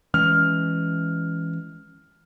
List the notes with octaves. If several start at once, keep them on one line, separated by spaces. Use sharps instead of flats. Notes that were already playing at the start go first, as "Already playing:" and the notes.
E3 G#3 C#4 F6